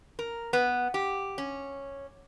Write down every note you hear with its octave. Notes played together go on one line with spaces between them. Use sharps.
A#4
B3
G4
C#4